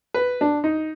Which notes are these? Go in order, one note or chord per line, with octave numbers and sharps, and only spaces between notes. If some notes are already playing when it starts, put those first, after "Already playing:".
B4
D4
D#4